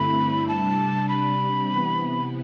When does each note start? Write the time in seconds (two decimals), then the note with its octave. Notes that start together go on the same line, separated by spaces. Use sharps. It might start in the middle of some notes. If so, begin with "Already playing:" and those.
Already playing: G2 D3 A3 C4 E4 B5
0.48 C3 G3 D4 A5
1.09 B5
1.69 C3 E3 B3